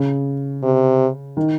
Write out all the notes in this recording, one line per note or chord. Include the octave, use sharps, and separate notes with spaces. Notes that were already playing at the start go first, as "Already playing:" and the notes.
Already playing: C#3
C3
D#3